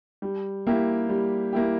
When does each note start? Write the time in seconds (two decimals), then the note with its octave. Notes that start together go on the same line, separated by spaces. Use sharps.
0.22 G3
0.67 A#3 E4 G4
1.09 G3
1.53 A#3 E4 G4